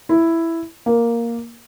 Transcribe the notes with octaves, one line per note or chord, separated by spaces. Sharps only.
E4
A#3